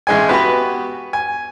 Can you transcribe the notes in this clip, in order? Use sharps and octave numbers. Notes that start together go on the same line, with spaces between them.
A1 G#3 G#5
B3 F#4 G4 B4
G#5